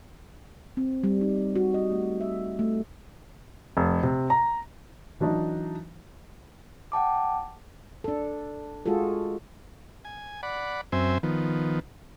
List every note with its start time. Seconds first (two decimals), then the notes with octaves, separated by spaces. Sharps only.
0.77 C4
1.03 G3
1.21 D#4
1.55 F#4
1.74 D#5
1.92 A3
2.21 E5
2.59 A3
3.77 F1
4.03 C3
4.30 A#5
5.20 E3 F#3 D4 D#4
6.92 F#5 G5 A5 D6
8.04 D4 A4
8.86 G#3 F4 F#4 G#4 A4
10.05 G#5
10.43 D5 F#5 B5
10.92 F#2 C4 C5 E5 G#5
11.23 D#3 F3 B3